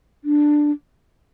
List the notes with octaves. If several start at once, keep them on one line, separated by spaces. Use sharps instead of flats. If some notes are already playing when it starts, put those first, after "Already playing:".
D4